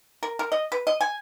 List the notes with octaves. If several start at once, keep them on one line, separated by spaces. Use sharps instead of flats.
A#4
A#4
D#5
B4
D#5
G#5